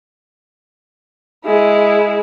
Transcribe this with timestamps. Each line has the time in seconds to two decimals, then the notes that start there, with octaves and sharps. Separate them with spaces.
1.45 G#3 E4